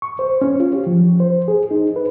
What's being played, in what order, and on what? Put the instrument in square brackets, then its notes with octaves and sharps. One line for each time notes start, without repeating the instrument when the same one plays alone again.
[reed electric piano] C#6
C5
C#4
F4
G4
F3
C5
G#4
D#4
B4